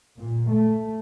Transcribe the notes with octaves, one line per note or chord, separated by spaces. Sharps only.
A#2
A3